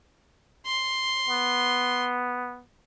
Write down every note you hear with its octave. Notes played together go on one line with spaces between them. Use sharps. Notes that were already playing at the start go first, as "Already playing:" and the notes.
C6
B3